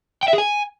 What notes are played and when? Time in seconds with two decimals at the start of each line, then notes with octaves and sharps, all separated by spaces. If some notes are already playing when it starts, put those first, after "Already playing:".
0.23 G5
0.28 E5
0.33 G#4
0.38 G#5